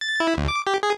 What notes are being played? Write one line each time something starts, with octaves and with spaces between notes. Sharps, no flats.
A6
E4
D2
D6
G4
G#4